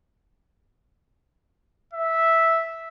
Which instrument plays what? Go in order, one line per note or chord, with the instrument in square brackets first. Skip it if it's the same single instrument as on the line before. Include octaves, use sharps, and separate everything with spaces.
[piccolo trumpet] E5